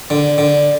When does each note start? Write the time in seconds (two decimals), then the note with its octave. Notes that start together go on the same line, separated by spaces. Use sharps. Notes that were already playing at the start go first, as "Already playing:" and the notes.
0.10 D3
0.38 D3